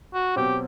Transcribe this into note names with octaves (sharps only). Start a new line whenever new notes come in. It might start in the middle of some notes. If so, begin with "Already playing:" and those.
F#4
B2 F#3 C4 F#4 G4